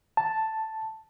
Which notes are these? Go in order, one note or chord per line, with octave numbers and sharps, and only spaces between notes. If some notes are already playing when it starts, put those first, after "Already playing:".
A5